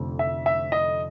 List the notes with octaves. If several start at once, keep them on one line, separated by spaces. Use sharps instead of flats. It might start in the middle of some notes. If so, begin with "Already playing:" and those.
Already playing: F1 F2 D3 A3
E5
E5
D#5